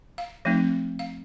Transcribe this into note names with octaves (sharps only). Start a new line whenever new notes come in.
F5
F3 A3 C4 D#4
F5